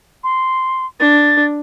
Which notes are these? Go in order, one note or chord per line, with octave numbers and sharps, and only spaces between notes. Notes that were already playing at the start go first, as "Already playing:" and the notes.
C6
D4 A6